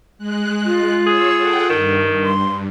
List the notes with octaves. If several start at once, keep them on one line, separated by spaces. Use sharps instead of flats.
G#3 F#6
F4
G#4 C#5 E6
A4 F#5 G5
G2 D#3
C6